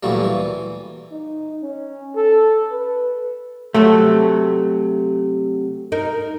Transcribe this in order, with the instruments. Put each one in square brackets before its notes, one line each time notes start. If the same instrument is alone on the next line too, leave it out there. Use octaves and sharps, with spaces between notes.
[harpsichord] D2 A#2 E3 F#3 G3
E3
[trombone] D#4
C#4
A4
B4
[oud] C3 F#3 F#4 [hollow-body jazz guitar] A3
[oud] D#4 A#4